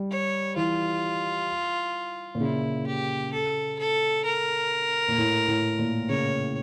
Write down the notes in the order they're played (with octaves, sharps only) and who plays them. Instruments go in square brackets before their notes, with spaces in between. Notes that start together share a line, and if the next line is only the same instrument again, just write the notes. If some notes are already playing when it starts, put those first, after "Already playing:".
Already playing: [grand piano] G3
[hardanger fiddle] C#5
[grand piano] E3 [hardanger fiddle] F4
[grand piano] A#2
[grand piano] C#3 [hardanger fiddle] E4
[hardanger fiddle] G4
A4
A4
A#4
[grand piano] A#2
A2
A2
A#2
[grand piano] C#3 [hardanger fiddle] C#5